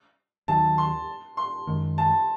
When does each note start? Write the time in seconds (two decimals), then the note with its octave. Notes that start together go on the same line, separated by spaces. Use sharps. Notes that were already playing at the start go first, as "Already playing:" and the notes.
0.48 D#2 D#3 F#3 A5
0.78 C6
1.37 C6
1.67 F#2 D#3 G#3
1.98 A5